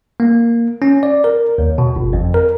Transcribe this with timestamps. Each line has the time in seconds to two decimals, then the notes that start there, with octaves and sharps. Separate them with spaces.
0.20 A#3
0.82 C#4
1.03 D5
1.24 A#4
1.58 D#2
1.78 B2
1.96 G1
2.13 F2
2.34 A#4